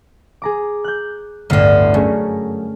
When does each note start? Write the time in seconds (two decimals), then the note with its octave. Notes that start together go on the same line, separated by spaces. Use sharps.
0.42 G#4 A#5 D6
0.84 F#6 G6
1.50 G1 D2 A2 D3 F6
1.94 F#2 A3 C#4 G#4